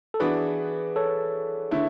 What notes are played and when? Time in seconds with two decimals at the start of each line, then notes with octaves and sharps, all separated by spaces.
0.14 A4
0.20 E3 B3 D4 F#4 G#4 B4
0.96 A4 C#5
1.71 D3 A3 E4